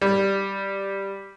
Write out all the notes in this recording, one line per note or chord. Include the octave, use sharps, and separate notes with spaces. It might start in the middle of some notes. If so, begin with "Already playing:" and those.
G3